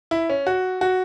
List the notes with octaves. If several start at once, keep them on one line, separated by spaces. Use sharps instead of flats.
E4
C#4
F#4
F#4